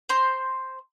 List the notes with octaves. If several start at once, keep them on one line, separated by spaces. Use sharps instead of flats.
C5 A#5 C6